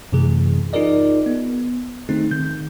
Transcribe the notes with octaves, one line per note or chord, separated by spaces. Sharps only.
F#2 C3 E3 A3 G#4
D#4 F4 G#4 A#4 D5 D#5
B3
D#3 A3 C4 D#4 G#4
D#3 G6